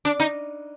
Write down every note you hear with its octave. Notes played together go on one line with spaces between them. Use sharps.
D4
D#4